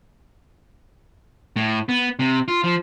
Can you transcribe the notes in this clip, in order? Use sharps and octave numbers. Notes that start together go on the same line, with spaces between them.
A2
B3
C3
F4
F3